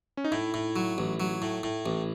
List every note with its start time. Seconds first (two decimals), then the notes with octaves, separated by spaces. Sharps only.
0.17 C#4
0.24 D#4
0.32 A2 E4
0.54 A2
0.76 F#3
0.98 A1
1.20 F#3
1.42 A2
1.63 A2
1.86 A1